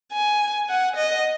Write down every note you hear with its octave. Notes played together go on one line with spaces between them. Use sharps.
G#5
F#5
D#5